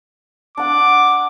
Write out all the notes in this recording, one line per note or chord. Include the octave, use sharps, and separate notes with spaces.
D4 F#5 D6